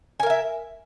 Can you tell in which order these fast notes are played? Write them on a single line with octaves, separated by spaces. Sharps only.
G#5 A#4 F5 E5